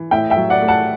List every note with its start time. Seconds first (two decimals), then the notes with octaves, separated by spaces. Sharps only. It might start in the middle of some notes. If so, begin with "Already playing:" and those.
Already playing: E3
0.11 A2 E5 G5
0.30 E5 G5
0.36 F#3
0.50 D5 F#5
0.62 A3
0.68 F#5 A5